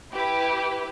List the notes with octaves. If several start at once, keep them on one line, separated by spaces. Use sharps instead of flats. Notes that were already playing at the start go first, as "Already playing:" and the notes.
E4 G4 B4